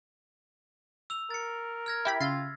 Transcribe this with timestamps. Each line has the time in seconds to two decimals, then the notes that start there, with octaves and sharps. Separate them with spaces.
1.10 E6 F7
1.30 A#4 A6 C#7
1.86 F6 G#6 A#6
2.05 E4 G4 B5
2.20 C#3 F4 F5 C6 E6 A6 B6